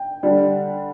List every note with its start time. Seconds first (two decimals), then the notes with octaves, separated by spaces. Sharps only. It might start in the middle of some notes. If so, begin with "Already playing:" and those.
Already playing: G5
0.23 D3 G3 D4